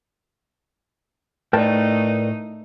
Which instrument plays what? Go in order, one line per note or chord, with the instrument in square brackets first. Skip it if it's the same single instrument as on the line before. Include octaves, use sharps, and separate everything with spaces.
[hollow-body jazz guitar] A2 G5 A5 [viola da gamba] A3 D#4 [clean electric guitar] A#4 B4 D5